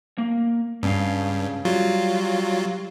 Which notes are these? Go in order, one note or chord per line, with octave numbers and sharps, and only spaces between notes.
A#3
C#2 G2 C#4 F5
F#3 G3 F4